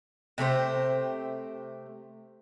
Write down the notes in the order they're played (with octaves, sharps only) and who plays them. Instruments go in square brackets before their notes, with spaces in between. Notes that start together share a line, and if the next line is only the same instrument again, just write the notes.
[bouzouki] C3 A3 G4 C5